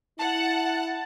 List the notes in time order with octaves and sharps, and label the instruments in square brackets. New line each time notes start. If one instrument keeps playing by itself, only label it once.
[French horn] E4 [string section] F#5 [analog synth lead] A5